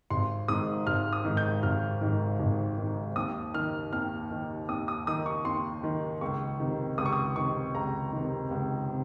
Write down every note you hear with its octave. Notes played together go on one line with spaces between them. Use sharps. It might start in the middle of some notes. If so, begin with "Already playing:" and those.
G#1 C6
G#2 D#3 D#6
G#1 F6
D#6
G#2 D#3
G6
G#1 F6
G#2 D#3
G#1
G#2 D#3
D#2 D#6
D#3 F6
D#2 F6
D#3
D#2 D#6
D#6
D#3 D#6
C#6
D#2 C6
D#3
C#2 C#6
C3 D#3
C#2 D#6
C#6
D#6
C3 D#3 C#6
C#2 A#5
C3 D#3
C#2
C3